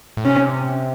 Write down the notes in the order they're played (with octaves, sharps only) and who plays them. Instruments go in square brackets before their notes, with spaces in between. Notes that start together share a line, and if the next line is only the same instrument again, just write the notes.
[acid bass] A2
[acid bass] C3 [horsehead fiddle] C#4